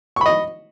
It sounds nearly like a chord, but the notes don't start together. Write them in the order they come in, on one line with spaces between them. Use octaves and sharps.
C#6 B5 D#5